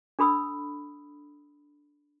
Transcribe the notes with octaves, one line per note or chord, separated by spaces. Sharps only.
D4 A4 B5 D#6 E6